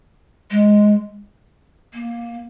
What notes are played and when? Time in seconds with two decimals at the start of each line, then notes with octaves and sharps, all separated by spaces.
0.51 G#3
1.93 A#3